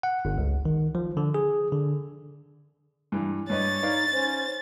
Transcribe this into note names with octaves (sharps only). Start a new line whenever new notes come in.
F#5
G1
C#2
D#3
F3
D3
G#4
D3
G2 E3
G2 B4 C#5 D#5 A6
D#4 B4 D5 F5
C#4 C5